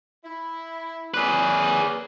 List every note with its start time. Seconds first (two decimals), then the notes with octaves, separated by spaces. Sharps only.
0.25 E4
1.14 A#3 G#4 B4 C#5 D5